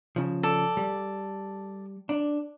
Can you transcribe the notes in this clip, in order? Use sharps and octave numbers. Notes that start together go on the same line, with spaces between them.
C#3 F3
A4 D5
G3
D4